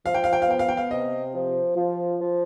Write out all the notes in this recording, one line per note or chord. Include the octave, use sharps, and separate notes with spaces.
F3 F5
G5
F5
G5
F5
B3 G5
F5
G5
F5
C3 D#5
F3
F3
F3